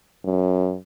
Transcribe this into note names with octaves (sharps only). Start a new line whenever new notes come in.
F#2